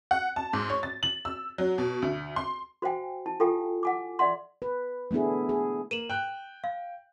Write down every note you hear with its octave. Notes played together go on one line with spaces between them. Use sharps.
F#5
A5
G#2
C#5
A6
F#7
E6
F#3
B2
D2
C6
F#4 C5 F5 G5 G#5
E4 A5
F4 G4 A4 F5 G5 G#5
F#5 G#5 D6
D5 E5 F#5 C6
B4
A3 B3 D4 E4 G#4
G#4
A#3 D#7 E7 F#7
G5 F#6
F5